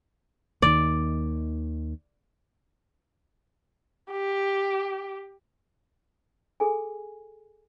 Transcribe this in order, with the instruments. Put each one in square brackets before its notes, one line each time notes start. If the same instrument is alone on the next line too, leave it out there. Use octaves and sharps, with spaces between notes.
[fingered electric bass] D#2 D#3 [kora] D5
[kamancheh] G4
[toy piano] G#4 A4 G#5